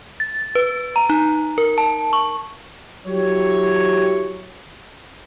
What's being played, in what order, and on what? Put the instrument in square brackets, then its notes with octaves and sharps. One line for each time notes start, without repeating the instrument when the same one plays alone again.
[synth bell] A6
B4
A#5
D#4
A#4
A5
C#6
[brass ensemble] F#3 E4 G4 C#5